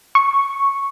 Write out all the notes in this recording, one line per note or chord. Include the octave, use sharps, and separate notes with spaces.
C#6